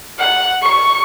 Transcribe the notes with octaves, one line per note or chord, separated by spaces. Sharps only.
F#5
C#6